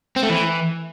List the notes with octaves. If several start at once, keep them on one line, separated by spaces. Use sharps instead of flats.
C4
A3
E3